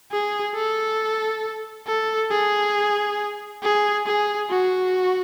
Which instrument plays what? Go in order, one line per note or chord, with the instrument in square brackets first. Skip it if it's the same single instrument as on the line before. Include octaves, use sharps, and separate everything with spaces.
[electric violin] G#4
A4
A4
G#4
G#4
G#4
F#4